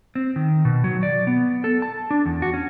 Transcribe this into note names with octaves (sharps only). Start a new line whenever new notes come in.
C4
D#3
B2
F#3
D5
B3
A4
A5
D4
E2
F#4
C#4